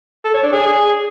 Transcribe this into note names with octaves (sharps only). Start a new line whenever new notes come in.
A4
C#5
D4
G#4